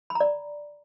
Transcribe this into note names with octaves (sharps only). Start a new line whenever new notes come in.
B5
A#5
D5